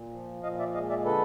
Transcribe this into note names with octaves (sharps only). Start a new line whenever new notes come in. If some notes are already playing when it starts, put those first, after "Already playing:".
Already playing: A#2
F3
A#2 D#5 F5
D5 E5
G#3 D#5 F5
D5 E5
D3 A4 B4